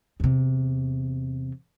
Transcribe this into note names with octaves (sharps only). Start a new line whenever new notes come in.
E2 C3